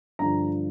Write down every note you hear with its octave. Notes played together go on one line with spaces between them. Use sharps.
G2 D3 F3 A#5